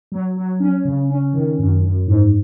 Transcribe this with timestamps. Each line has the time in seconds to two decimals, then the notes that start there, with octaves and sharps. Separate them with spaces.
0.12 F#3
0.37 F#3
0.60 C#4
0.85 C#3
1.10 C#4
1.33 D#3
1.59 F#2
1.83 F#2
2.07 G#2